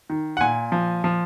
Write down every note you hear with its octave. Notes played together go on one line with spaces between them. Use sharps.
D#3
F#5
A#2 G#5
F3
F3